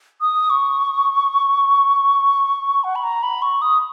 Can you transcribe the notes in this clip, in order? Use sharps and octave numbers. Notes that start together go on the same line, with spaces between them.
D#6
C#6
F#5
B5
A#5
B5
C#6
D#6